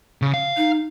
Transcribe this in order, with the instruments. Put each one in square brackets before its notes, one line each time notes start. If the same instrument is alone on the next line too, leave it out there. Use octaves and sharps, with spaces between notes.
[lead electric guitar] C#3
F5
[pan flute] D#4